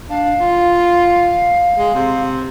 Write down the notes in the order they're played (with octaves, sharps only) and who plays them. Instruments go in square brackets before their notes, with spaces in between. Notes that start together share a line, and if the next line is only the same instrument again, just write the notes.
[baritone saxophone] D4 [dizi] F5
[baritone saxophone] F4
G#3
C3